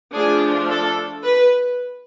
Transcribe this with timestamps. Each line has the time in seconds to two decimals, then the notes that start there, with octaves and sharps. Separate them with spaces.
0.14 F3 A3 D4 G#4
0.70 A4
1.24 B4